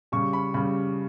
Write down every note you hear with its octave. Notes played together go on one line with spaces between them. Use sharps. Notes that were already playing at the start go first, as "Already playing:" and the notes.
C#3 G3 C#6
B5
C#3 G3 B5